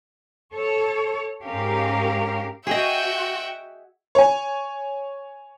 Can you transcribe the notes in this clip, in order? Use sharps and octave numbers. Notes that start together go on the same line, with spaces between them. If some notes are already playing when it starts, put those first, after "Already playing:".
A4 C#5
G#2 G#3 C#4 G4 A#4 F5
F#4 G#4 D#5 E5 F#5 G5
C#5 G#5